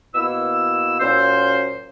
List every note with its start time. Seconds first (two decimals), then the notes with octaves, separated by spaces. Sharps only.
0.15 B2 A#3 E4 E6
0.99 A#2 F#3 C#4 C5